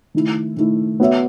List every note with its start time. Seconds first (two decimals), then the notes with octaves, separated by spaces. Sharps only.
0.15 D#3 A3 E4
0.57 D#3 A3 E4
1.00 B3 F#4 C#5 E5